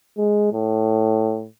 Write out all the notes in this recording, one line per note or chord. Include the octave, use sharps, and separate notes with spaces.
G#3
A2